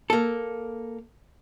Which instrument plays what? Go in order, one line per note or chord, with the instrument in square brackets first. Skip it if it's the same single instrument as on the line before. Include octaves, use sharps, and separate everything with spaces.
[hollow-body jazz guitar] A#3 A4